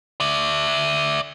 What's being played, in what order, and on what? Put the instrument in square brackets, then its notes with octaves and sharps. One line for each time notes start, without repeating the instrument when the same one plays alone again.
[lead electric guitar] D5 E5